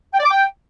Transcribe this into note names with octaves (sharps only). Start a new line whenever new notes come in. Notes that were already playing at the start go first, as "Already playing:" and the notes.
G5
D5
D6
G5